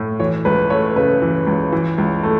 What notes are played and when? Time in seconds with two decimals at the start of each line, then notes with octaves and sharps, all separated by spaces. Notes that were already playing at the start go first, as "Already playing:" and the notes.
Already playing: A2
0.19 E3 C#5
0.45 C#2 B4
0.70 A3 C#5
0.96 C#3 B4
1.22 E3
1.47 C#2
1.72 E3
1.98 C#2
2.23 A3